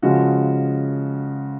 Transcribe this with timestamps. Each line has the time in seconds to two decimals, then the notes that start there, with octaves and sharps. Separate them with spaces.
0.02 C#3 F3 G#3 F#4